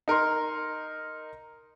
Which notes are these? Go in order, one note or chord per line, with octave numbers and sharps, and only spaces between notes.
D#4 A#4 A#5 C6